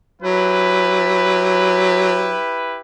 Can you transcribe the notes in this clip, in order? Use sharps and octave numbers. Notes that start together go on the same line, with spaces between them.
F#3 E4 G4 B4